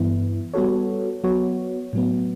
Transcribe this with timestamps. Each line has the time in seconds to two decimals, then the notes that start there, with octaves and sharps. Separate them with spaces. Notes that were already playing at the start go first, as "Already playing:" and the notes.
Already playing: G2 E3 B3 E4
0.54 G3 B3 F#4 A4 C#5
1.24 F#3 B3 F#4 C#5
1.93 A2 F#3 B3